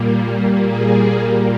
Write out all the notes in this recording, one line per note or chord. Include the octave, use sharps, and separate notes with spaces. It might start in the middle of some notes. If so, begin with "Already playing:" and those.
Already playing: A#2 G3 A#3
G#4